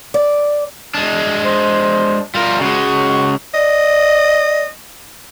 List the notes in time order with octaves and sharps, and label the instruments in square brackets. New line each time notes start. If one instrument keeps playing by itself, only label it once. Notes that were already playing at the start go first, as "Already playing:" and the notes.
[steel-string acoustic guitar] D5
[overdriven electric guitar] G#3 D4
[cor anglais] C5
[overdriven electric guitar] G3 A#4 [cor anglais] F4
[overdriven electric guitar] C#3 G#3 [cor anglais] F#4
[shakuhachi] D5 [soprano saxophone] D#5